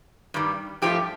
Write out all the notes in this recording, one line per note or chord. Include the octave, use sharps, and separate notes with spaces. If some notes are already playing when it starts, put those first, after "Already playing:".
G2 D#3 G3
G2 F3 A3 G4